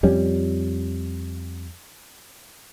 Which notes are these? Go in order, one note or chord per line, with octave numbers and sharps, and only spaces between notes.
F2 G3 C#4